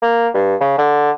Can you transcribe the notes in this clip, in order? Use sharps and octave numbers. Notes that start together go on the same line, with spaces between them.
A#3
G2
C#3
D3